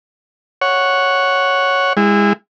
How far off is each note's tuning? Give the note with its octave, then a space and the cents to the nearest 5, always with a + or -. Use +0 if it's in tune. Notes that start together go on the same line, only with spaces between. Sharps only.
C#5 +0 F#5 +0
G#3 -30 E4 -5